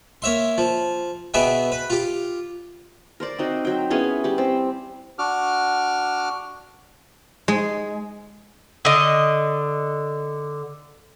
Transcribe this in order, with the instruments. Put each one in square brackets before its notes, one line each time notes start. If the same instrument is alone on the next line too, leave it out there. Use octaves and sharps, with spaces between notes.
[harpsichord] A#3 C#5 E5 C6
F3
B2 B3 G#4 E5 G5
B4
F4 G4
[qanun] A#4 C5 D5
C4 D#4 F#4
F#3 G5
B3 C#4 E4 G#4
G3 G4
C4
[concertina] D4 F#4 D6 F6
[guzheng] G#3
[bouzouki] D3 D#5